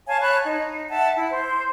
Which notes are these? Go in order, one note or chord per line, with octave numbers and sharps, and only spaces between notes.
C#5 F5 G#5 A5
C#5 A5 B5 F#6
D#4
E5 F#5 A5
E4
C5